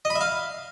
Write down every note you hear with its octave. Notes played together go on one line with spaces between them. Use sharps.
D#5
B5
E5
F5